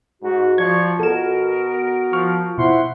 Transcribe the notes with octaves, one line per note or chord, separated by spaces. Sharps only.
G#2 F#4
F3 F#4 D5 C#6 G#6
B2 B3 F#4 A4 A#4 E7
F3 C#6 F6
B2 E4 C5 F#5 C6